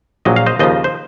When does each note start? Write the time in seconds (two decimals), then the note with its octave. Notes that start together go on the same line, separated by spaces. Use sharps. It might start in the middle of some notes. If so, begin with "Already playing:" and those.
0.25 A#1 A#2 F#3 D#5
0.36 F5
0.46 C5 D#5
0.59 D#2 C#3 F3 C5 D#5
0.84 C5